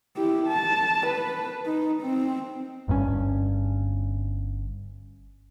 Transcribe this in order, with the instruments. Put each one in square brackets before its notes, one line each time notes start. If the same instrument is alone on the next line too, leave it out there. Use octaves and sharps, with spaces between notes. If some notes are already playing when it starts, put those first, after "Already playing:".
[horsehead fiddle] E4 G4
A5
B4
D#4
C4
[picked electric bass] G1 G2 C3 C#4